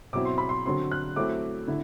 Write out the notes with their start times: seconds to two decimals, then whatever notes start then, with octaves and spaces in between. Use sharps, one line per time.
0.13 B2 F#3 C4 E4 D6
0.25 C6
0.38 B5
0.49 C6
0.65 D3 F#3 C4 C6
0.91 F#6
1.16 F#3 A3 C4 E4 D6
1.68 D3 E4